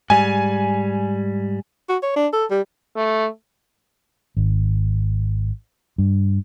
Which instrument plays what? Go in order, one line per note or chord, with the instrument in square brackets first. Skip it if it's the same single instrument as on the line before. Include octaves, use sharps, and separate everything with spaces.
[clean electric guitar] G#2 G3 [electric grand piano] G#5
[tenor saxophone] F#4
C#5
D4
A4
G3
[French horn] A3
[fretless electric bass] G#1
G2